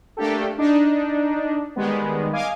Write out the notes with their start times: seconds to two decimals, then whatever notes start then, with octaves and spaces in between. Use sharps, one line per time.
0.17 A3 A#3 D4 G4 A4
0.58 D4 D#4
1.76 D#3 G3 G#3 B3
2.33 D#5 F5 G#5 D6